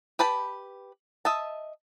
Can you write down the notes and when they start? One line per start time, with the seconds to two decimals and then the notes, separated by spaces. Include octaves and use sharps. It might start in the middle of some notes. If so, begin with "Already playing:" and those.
0.19 G4 B4 A5 B5
1.25 D#5 E5 A5